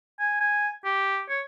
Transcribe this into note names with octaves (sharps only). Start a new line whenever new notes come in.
G#5
G#5
G4
C#5